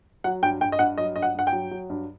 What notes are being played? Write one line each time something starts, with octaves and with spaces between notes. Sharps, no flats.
F#3 F#5
G2 G5
G2 G5
D#5
G2 F#5
F#3 D#5
G2 D#5
F#5
G2 F#5
G5
F#3
F#3
G2